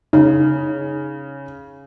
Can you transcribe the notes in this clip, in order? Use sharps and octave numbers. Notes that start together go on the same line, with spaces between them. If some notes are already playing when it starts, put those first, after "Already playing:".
C#3 D#4